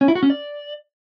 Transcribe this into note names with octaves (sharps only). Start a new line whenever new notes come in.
C#4
E4
F#4
C#4
D5